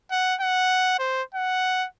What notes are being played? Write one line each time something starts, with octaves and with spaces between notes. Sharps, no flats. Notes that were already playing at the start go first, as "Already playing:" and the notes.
F#5
F#5
C5
F#5